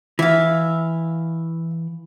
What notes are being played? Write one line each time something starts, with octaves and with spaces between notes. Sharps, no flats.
E3 E5 F5